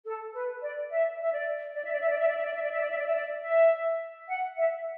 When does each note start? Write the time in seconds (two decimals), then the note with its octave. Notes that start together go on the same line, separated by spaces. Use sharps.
0.05 A4
0.34 B4
0.62 D5
0.90 E5
1.21 E5
1.33 D5
1.74 D5
1.84 E5
1.92 D5
2.01 E5
2.10 D5
2.19 E5
2.27 D5
2.36 E5
2.45 D5
2.54 E5
2.63 D5
2.72 E5
2.81 D5
2.90 E5
2.98 D5
3.07 E5
3.16 D5
3.44 E5
4.28 F#5
4.56 E5